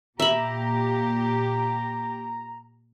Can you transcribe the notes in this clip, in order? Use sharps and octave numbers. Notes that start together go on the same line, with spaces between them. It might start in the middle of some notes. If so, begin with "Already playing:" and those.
A#2 G4 E5 A#5 B5